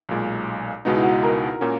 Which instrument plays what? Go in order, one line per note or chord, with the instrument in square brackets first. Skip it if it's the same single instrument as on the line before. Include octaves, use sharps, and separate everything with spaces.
[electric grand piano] B1 A#2 G#3
[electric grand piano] C#2 B2 G#3 B3 D#4 [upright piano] F#4
[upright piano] E4
F#4
A#4
[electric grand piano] A#2 A#3 C#4